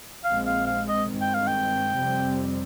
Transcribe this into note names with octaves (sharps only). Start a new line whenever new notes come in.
A#1 A#2 G#3 C4 F5
F5
F5
D#5
G2 D#3 G#3 C4
G5
F5
G5
F2 C3 G3 C4